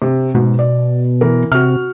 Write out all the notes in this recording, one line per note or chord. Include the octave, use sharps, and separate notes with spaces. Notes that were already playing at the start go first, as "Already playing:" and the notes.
C3
G#2 B2
D5
E3 A#4
C3 F#4 F6